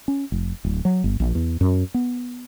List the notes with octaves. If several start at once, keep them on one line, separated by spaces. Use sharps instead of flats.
C#4
F1
D1
F#3
G1
A#1
E2
F#2
B3